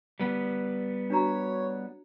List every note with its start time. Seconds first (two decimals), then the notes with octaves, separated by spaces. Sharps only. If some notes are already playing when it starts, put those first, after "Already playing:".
0.20 G3 B3
1.10 D4 F#4 C#5 A#5